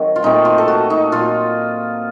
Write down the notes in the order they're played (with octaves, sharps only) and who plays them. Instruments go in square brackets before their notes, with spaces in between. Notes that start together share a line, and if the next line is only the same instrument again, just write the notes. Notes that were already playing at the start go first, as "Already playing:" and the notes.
Already playing: [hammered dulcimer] D#3 F#3 C4
F4
A#2 A3 C4 D#4
F4
A4
F#4
D#4
A#2 F#3 A#3 F4